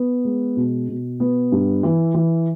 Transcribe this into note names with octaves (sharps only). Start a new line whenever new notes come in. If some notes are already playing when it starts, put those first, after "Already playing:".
Already playing: B3
G#3
B2
B2
B3
G2
E3
E3